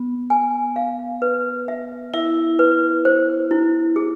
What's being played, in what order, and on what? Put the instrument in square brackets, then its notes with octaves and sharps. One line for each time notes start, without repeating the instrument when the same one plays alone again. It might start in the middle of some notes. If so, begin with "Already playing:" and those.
Already playing: [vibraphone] B3
[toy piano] G#5
F5
B4
E5
[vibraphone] E4 [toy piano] E5
[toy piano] B4
C5
E4
G#4